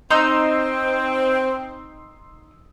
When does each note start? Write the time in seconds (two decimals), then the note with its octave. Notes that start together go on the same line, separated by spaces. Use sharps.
0.11 C4 D#4 C6 D#6 E6